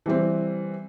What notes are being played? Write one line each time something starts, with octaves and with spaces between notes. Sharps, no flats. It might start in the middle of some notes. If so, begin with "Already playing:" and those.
E3 G3 C4